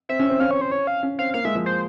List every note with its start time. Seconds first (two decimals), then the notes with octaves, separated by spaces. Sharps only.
0.09 C4 E5
0.19 C#4
0.30 C4
0.40 C#4 F5
0.51 C#5
0.61 C5
0.72 C#5
0.87 F5
1.03 C#4
1.19 C4 F5
1.34 A#3 F5
1.45 G#3 E5
1.55 F3
1.66 C5